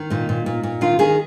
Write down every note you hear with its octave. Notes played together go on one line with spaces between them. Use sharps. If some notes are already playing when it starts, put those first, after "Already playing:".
Already playing: D#3
A#2 D#4
A#2
A#2
A#2
D#3 F4
D#3 G#4